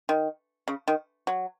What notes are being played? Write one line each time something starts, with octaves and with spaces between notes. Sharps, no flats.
D#3
C#3
D#3
F#3